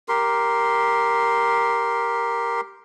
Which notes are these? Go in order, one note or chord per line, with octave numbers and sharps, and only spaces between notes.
G4 A#4 C6